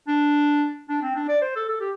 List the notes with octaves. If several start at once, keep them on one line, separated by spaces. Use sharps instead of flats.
D4
D4
C4
D4
D5
C5
A4
A4
G4